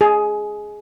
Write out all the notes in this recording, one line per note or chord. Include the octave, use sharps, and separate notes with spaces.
G#4